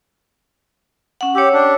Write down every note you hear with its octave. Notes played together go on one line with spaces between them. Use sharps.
C#4 F#5
G4 C#5 E6
D4